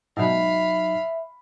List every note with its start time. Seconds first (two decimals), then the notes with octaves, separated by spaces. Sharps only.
0.17 G#2 B2 F#3 D#4 E5 F5 B5